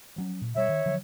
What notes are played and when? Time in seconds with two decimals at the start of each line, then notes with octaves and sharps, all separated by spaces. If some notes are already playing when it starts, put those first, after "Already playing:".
0.16 F3 F#3 C#4
0.42 A#2
0.55 B2 G3 C#5 E5
0.69 D#3
0.86 D3 F3 F#3